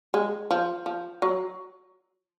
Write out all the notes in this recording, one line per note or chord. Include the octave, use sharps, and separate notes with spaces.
G#3
F3
F3
F#3